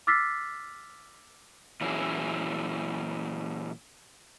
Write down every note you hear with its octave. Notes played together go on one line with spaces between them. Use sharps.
D6 E6 F6 A6 B6 C7
A#2 E3 F#3 C#4 E4 G#4